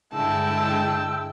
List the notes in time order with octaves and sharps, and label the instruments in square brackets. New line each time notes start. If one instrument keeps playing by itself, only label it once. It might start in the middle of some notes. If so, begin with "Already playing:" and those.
[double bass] G2 D3 [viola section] G#3 E4 G5 [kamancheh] A5 [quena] E6